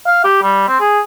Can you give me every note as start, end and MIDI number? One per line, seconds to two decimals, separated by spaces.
0.07 0.24 77
0.24 0.42 67
0.42 0.65 55
0.68 0.76 60
0.80 1.00 68